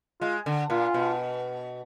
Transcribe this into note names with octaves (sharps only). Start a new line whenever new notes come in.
G#3 F4
D3
A#2 F4
B2